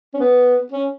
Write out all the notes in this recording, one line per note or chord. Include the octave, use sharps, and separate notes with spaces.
C#4
B3
C#4